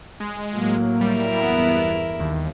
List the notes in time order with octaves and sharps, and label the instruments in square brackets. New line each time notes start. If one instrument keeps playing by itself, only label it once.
[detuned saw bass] G#3
[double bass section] A2 F#3 A#3
[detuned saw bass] G3 [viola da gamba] E4 A#4
[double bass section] E2 G2 [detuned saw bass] B3
[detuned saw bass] D#2